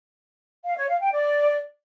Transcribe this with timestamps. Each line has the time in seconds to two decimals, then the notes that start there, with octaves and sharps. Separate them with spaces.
0.65 F5
0.77 C#5
0.89 F5
1.00 G5
1.12 D5